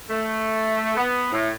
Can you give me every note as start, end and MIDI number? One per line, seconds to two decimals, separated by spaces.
0.10 0.94 57
0.97 1.31 59
1.32 1.48 45